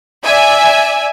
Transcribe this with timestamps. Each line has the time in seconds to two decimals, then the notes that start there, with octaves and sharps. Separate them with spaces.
0.23 D5 E5 G#5